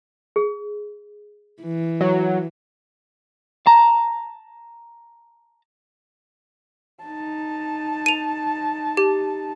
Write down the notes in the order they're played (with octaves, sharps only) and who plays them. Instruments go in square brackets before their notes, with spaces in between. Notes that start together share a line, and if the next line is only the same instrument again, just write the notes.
[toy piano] G#4
[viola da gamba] E3
[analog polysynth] F#3
[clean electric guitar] A5 A#5
[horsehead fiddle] D#4 A5
[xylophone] D#7 F7
G4